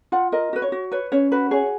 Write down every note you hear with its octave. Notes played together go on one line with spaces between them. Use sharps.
F4 F#5
A#4 D#5
F#4 B4
C#5
F#4
B4 C#5
C#4 C#5
F#4 B4
G#4 C#5